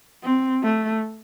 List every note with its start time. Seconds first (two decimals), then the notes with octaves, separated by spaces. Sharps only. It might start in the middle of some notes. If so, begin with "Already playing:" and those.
0.24 C4
0.63 A3